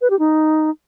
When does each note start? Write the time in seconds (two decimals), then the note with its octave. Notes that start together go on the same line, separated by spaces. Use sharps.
0.01 B4
0.10 G4
0.19 D#4